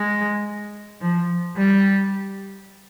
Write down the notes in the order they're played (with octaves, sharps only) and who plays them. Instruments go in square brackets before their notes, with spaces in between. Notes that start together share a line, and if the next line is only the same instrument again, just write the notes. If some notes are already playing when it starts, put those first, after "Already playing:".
Already playing: [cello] G#3
F3
G3